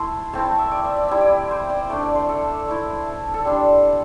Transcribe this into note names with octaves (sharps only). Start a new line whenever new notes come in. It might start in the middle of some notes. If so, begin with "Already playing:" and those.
Already playing: A3 E4 A5 C6
A3 C4 E4 A5
A5
E5
D5
E5
D5
G3 E4 E5
D5
C5
D5
A3 D4
D5
C5
A4
A3 E4
A5
A4
G3 D4 C5